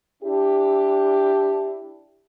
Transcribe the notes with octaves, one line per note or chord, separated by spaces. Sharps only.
D4 E4 G4